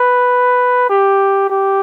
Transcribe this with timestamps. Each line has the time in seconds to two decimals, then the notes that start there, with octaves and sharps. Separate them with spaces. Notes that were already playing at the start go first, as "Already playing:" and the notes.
Already playing: B4
0.89 G4
1.50 G4